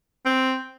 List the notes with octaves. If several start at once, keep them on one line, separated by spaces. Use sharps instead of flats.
C4